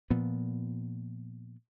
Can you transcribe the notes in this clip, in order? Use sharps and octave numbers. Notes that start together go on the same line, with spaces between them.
A#2 F3 B3